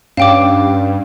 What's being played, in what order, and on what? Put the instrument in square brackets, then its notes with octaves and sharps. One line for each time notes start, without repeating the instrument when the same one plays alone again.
[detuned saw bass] G2 [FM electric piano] C#4 [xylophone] F5 G5 D6